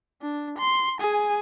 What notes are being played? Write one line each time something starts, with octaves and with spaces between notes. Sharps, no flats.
D4
C6
G#4 G#5